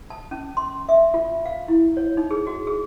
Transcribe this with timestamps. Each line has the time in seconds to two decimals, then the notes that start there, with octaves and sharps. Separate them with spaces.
0.10 A5
0.31 C#4
0.57 C6
0.89 E5
1.14 F4
1.45 F5
1.68 E4
1.97 C#5
2.17 D#4
2.31 G#4
2.47 F#4
2.67 G#4